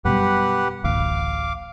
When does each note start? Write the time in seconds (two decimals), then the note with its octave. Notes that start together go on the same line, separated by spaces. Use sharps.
0.05 F#2 B2 G3 G4 B4 F#5
0.84 D1 A1 D2 F5 D6